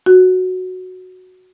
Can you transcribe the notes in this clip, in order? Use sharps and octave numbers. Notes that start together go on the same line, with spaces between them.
F#4